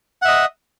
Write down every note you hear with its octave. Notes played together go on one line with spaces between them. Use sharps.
D#5 E5 F#5